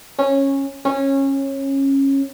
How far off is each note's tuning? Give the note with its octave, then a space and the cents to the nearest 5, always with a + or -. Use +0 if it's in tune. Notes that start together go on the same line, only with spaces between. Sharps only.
C#4 -15
C#4 -20